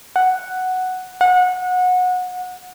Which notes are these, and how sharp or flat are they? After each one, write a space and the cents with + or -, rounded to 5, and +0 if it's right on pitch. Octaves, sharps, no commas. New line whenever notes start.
F#5 +0
F#5 -25